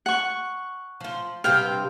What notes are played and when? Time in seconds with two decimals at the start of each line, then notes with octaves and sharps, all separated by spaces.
0.06 F#5 C#6
1.00 F3 F4
1.44 G2 C3 C4 F5 G5